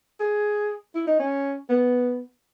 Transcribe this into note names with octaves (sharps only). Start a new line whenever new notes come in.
G#4
E4
D#4
C#4
B3